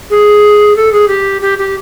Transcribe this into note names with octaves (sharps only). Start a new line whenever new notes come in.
G#4
A4
G#4
G4
G4
G4